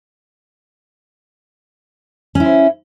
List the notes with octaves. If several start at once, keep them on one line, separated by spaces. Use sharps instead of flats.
C#4 E4 C5